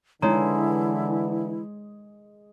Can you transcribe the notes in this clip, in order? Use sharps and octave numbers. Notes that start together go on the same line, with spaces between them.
D3 E3 G#3 D#4 E4 C#5 A#5